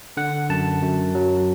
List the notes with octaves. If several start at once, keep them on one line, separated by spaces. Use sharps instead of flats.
D3 F#5
F#2 A5
F#2
F#3